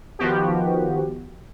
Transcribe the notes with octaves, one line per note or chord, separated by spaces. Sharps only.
D#3 F3 B3 F#4 G4